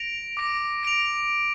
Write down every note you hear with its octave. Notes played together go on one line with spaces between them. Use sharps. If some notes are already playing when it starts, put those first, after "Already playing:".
Already playing: A#6 D7 F7
D6 A#6 D7
A#6 D7 F7